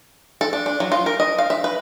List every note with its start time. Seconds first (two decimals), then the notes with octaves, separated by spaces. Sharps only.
0.41 A4
0.53 D4
0.66 D4
0.80 F#3
0.92 F4
1.06 A#4
1.20 D#5
1.38 F5
1.50 E5
1.64 B4